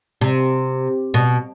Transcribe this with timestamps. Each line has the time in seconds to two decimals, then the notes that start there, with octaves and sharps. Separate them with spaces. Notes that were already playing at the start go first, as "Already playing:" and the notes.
0.21 C3
1.14 B2